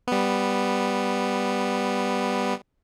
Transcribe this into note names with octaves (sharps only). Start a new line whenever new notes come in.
G3 B3